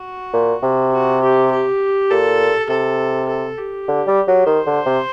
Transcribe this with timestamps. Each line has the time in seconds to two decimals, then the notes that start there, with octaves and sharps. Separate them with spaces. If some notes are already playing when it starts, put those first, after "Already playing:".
Already playing: F#4
0.33 A#2
0.63 C3
0.93 F#4
1.22 G4
1.51 G4
2.11 A#2 A4
2.69 C3 A4
3.29 A4
3.58 G4
3.88 D3
4.07 G3
4.27 F#3
4.46 D#3 C5
4.66 D3
4.86 C3